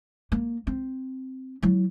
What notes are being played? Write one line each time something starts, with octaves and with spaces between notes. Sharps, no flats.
A#3
C4
F#3 E4